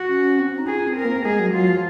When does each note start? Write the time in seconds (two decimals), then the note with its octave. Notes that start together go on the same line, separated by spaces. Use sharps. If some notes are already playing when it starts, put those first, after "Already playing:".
Already playing: F#4
0.08 C#4
0.39 C4
0.49 C#4
0.58 D#4
0.67 F4 G#4
0.87 C4
0.96 A#4
1.05 A#3
1.25 G#3 G#4
1.39 F#3
1.53 F#3 F4
1.68 F3